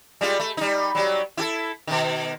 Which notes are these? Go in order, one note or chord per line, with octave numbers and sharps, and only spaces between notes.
G3 G#3 F4
A3
G3 D#4
F#3 G3
E4 F#4 A4
B2 D#3